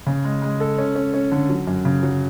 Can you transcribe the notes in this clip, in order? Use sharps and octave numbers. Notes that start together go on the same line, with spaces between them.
C#3
G#3
G#3
A4
C#4
C#4
C#4
D3
F#3
F#2
C#3
F#3